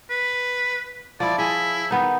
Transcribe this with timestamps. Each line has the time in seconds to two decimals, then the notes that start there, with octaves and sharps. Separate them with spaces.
0.11 B4
1.20 F3 E4 D5
1.38 E4 G#4 D#5
1.91 D#3 B3 D#4